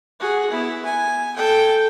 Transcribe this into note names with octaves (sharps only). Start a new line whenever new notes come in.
F#4 G#4
B3 E4
G#5
A4 G5